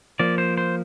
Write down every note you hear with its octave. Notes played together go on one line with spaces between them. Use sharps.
F3 A#3 D5
C5
C5